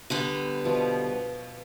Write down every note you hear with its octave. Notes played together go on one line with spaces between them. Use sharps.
D3 G3 B3
B2 F3